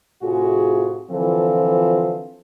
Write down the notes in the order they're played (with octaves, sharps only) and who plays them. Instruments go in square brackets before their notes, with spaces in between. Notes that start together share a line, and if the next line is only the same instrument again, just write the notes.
[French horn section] A2 C3 F4 F#4 G#4
D3 E3 F3 C4 F4 A4